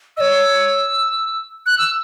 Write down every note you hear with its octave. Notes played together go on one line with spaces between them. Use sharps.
C#5 D#5 E6
F#6
E6